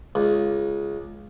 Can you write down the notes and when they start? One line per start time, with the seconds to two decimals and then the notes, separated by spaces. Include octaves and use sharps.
0.15 C#2